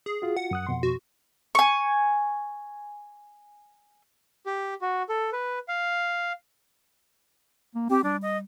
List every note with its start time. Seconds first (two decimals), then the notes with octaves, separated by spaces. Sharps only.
0.06 G#4
0.22 F4 F#4
0.37 F#5
0.51 F#2 D#6 F#6
0.67 F2 B2 C6
0.83 F#4
1.55 G#5 C#6
4.45 G4
4.82 F#4
5.09 A4
5.33 B4
5.68 F5
7.75 A#3
7.90 C4 G4
8.04 G3 D4
8.22 D#5